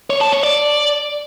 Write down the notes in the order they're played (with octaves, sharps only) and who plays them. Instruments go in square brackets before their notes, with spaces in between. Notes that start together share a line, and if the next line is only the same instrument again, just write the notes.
[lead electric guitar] C#5
A5
C#5
D5